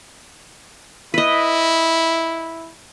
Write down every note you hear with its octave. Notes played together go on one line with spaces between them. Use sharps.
E4 B4 D#5